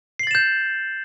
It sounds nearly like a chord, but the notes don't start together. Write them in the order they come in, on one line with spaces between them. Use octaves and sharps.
C7 F#7 A6 E7 G6